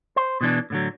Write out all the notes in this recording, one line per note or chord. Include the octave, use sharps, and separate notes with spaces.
C5
B2 E3 D4
A2 D3 F#3